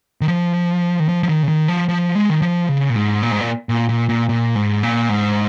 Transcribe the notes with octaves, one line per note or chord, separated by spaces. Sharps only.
D#3
F3
D#3
F3
F3
D#3
C#3
D#3
F3
F3
G#3
D#3
F3
C#3
A#2
G#2
A#2
G#2
A#2
A#2
A#2
A#2
A#2
G#2
A#2
G#2